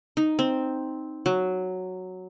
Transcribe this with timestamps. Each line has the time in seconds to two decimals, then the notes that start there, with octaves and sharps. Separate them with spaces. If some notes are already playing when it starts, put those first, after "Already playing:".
0.17 D#4
0.39 C4
1.26 F#3